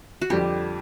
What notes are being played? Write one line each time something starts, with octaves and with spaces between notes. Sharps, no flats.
F#4
F2 D3 G3 G4